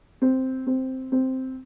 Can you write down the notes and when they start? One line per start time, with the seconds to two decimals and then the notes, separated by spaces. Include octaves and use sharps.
0.22 C4
0.67 C4
1.12 C4